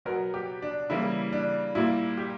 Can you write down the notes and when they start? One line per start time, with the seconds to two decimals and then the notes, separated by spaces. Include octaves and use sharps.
0.05 B2 F#3 B3 A#4
0.34 G4
0.62 D4
0.90 C#3 E3 G3 A#3 E4
1.32 D4
1.75 A#2 G3 A#3 E4
2.18 G4